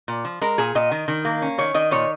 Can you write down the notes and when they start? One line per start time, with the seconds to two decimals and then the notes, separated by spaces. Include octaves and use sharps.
0.08 A#2
0.25 F3
0.41 G#3 A#4
0.58 A#2 G#4
0.75 A#2 D#5
0.91 D#3
1.08 D#3
1.25 A#3
1.42 C#4
1.58 D#3 C#5
1.74 D#3 D#5
1.91 A#2 C#5